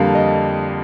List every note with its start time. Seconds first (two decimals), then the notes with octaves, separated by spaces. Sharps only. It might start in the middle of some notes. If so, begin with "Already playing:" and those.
Already playing: F2 D3 G3 A#3 F5
0.15 D#5